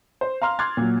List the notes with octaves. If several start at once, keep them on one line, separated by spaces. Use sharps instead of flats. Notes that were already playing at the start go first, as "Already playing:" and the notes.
C5
F5 A#5 C6 F6
C6 D6 F6 F#6 G#6 A6
A#2 F#3